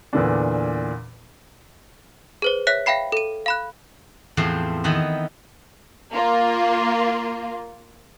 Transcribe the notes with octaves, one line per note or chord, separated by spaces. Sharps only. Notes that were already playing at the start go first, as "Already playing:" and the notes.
E2 A#2 D3 D4
G#4 B4 C5
C#5 E5 F#6 B6
E5 F5 G5 B5 C7
A4 D#7
F5 B5 F#6
E2 A2 E3 F3 C4 C5
D#3 E3 B3 E5
A#3 F4